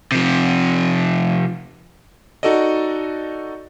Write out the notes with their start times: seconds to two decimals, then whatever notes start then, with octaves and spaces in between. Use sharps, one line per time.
0.12 C3 F3
2.43 D#4 F#4 A4 D5 D#5